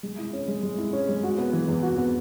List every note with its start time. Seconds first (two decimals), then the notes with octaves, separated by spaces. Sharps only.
0.03 G#3
0.18 E4
0.33 C#4
0.48 G#3
0.63 G#3
0.78 E4
0.93 C#4
1.08 G#3
1.23 F#4
1.38 B3
1.53 E3
1.69 E2
1.83 F#4
1.98 B3